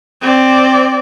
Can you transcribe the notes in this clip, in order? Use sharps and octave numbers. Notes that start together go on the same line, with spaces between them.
C4 D5